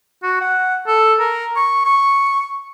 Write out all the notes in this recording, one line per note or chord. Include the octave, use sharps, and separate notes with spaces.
F#4
F#5
A4
A#4
C#6
C#6